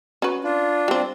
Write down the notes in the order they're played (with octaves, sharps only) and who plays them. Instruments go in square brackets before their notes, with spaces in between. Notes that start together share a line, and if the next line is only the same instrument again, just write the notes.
[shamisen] C#4 F#4 B4
[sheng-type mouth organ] D4 F4
[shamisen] G3 C4